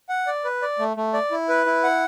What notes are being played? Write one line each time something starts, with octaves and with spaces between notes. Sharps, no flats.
F#5
D5
B4
D5
A3
A3
D5
E4
B4
E4
F#5